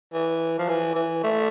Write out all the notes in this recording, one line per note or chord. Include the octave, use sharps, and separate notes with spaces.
E3
F3
E3
E3
A3